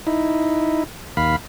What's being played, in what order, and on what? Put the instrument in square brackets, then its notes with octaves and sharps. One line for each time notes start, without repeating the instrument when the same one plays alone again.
[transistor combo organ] D#4 E4
D#2 F5 B5